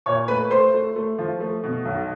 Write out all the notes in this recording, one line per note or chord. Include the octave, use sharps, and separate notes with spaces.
A#2 C#5 C#6
A3 B4 B5
A3 C5 C6
A3
A3
F3
A3
B2
B1